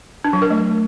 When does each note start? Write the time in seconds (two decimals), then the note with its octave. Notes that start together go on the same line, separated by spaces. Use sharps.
0.24 D4
0.33 F#3
0.42 A#4
0.50 A3